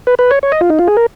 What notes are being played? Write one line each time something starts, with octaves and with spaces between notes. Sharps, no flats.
B4
B4
C#5
C#5
D#5
F4
D#4
F4
G#4
A#4